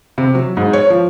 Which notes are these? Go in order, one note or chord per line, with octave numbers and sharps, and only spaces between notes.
C3
F#3
G#2
C#5
F3